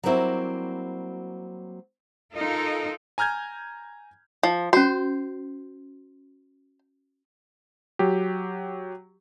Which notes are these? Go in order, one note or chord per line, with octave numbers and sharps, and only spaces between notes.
F#3 G3 A#3 C4 E4 F#4
D#4 F4 A4 A#4
G#5 A#5 F6 G6 G#6
F3
C#4 F#4 C5
F#3 G4